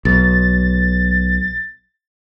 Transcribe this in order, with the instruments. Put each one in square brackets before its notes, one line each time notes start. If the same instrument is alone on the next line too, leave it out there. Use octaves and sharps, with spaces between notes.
[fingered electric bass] B1 [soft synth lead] A6